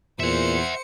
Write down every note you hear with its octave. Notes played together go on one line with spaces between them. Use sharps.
E2 A#2 C5 E5 F#5 C#7